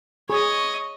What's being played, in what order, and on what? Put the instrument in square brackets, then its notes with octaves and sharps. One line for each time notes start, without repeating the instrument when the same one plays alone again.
[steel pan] G#4 [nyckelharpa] C#5 D#5